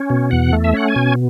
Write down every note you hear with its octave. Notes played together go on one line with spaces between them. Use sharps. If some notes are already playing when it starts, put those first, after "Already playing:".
Already playing: C#4
B2
E2 F#5
A3
E5
C#4 F#5
G#5
B2